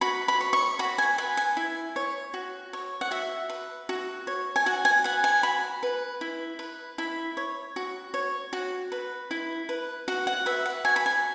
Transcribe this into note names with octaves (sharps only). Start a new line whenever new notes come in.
F#4 B5
B5
C#5
C#6
F#4 B5
G#5
B4 B5
G#5
E4
C#5
F#4
C#5
F#5
F#4 E5
B4
F#4
C#5
G#5
F#4 F#5
G#5
B4 F#5
G#5
F#4 B5
B4
E4
B4
E4 B5
C#5
F#4
C#5
F#4
B4
E4
B4
F#4 F#5
F#5
B4 E5
F#5
F#4 G#5
B5
G#5